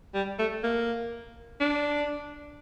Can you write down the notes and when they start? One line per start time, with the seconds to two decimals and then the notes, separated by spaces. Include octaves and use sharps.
0.14 G3
0.39 A3
0.64 A#3
1.60 D4